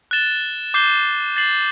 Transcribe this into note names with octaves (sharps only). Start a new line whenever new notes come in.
F#6 A6 E7 G7
D6 G6 C7 G7
A6 C7 F#7